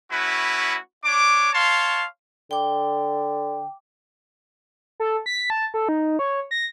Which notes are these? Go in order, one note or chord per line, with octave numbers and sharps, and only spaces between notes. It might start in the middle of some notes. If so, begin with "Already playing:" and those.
A3 C#4 E4 F#4 B4
D4 C#5 D6
C#5 F5 A5 C6
D3 G5 D6
A4
B6
A5
A4
D#4
C#5
A#6